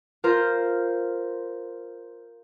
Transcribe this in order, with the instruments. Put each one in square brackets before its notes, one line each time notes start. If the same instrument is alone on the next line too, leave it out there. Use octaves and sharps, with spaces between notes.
[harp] F4 A#4 C5